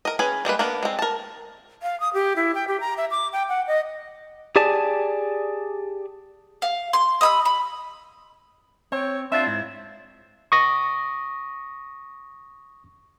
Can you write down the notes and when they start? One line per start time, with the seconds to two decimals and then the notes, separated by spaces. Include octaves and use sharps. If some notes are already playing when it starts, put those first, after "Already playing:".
0.05 A#4 D#5
0.19 C#4 G#4 B4 G#5
0.45 G3 G#3 A#3 B4
0.59 A#3 B3 D4 A#4
0.83 G#3 C4
0.99 A#4 A5
1.83 F5
2.00 D#6
2.14 G4
2.36 E4
2.55 G5
2.68 G4
2.80 A#5
2.97 E5
3.11 D6
3.33 G5
3.49 F#5
3.67 D#5
4.56 G4 G#4 D5 G#5 A5
6.62 F5
6.93 C6
7.21 D#5 B5 E6
7.45 B5
8.92 C4 C#5
9.32 C4 D4 F4 E5
9.47 G#2 E4
10.52 C#6 D#6 A#6